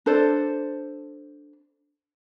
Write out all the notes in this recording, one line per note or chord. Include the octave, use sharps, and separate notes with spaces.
D4 A4 C5 D5